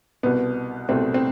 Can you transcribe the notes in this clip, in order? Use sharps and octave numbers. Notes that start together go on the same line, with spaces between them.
C2 B2 B3
C2 B2 A3 C4
C4